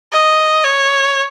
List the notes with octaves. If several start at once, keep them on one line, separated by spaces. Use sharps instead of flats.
D#5
C#5